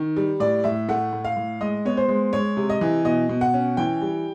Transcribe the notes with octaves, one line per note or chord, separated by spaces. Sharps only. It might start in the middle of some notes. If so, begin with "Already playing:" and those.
Already playing: D#3
G3
A2 D5
A2 E5
A3 F#5
A2
F5
A2
G#3 D#5
B3 C#5
C5
G#3
G#3 C#5
C3
D#5
E3
B2 D#5
B2
F#5
C#4
E3 G5
G3